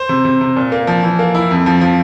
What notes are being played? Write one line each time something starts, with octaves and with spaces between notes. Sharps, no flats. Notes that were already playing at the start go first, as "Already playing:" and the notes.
Already playing: C5
C3
C3
C3
A#2
A#3
F3
E3
A#3
E4
F2
F3
F3